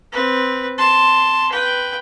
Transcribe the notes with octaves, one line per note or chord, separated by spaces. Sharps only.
C4 B4
A5 C6
B4 G5